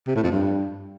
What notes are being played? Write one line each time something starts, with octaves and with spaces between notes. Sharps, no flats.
C3
A2
F2
G2